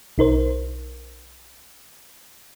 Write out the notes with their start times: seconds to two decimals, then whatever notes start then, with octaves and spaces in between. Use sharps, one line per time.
0.18 B1 D#4 A#4 C5